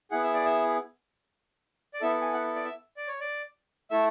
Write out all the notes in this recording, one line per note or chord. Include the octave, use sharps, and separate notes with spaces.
B3 E4 G#4 F#5
E5
D5
E5
D5
B3 E4 A4 E5
G#5
F#5
D5
E5
D5
C#5
D5
A3 E4 A4 E5